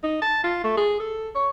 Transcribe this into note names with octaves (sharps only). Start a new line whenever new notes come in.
D#4
A5
F4
A3
G#4
A4
C#5